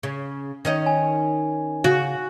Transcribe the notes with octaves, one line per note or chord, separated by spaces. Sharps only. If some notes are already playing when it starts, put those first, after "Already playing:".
C#3
D#3 C#4 D#5
G#5
C#3 F#4